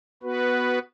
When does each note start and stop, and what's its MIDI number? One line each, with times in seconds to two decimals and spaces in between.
0.23 0.79 59
0.23 0.79 66
0.23 0.79 71